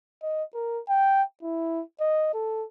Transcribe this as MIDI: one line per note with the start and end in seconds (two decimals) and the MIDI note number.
0.23 0.43 75
0.55 0.80 70
0.89 1.23 79
1.43 1.82 64
2.00 2.30 75
2.34 2.65 69